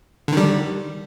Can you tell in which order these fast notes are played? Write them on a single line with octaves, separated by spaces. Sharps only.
D3 D#3 G3